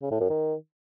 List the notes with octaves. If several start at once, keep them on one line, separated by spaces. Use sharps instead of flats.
C#3
A2
F#2
D#3